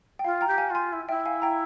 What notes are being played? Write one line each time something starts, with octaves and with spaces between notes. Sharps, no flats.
G5
F4 F5
G5 A#5
G4
F5 G#5
F4
G#5 C6
E4
E4 E5 G5
F5 G#5
G5 A#5